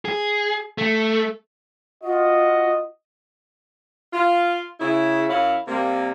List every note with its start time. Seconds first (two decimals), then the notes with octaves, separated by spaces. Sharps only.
0.05 G#4
0.78 A3
2.04 F4 F#4 D#5
4.13 F4
4.80 C#3 E4
5.29 F#2 E4 C#5 F5
5.68 C3 G3 A#3